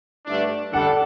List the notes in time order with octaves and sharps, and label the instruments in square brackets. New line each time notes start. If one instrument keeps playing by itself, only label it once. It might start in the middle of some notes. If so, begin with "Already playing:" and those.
[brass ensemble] G2 D3 A3 D4
[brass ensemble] D3 G3 D4 A4 [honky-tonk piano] F#5